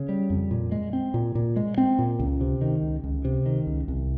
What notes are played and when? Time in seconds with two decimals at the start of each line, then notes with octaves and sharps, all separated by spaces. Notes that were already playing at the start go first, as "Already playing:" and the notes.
Already playing: C#3
0.09 G3
0.30 F2
0.51 A#2
0.72 G#3
0.93 C4
1.14 A#2
1.35 A#2
1.56 G#3
1.78 C4
1.99 A#2
2.19 C#2
2.41 C3
2.61 D#3
2.83 C#2
3.04 C#2
3.25 C3
3.46 D#3
3.67 C#2
3.88 C2